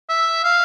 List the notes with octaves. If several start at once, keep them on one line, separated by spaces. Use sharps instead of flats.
E5
F5